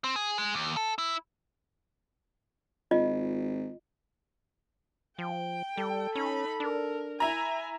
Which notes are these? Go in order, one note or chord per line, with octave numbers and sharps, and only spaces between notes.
C4
G#4
G#3
D#2
A4
E4
G#1 F4 D#5
F3 G5
G3 A4
C#4 D#4 B5
D4 A#4
E4 G#5 A#5